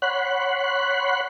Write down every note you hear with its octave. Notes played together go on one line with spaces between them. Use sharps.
C#5 F#5 B5 C6 F#6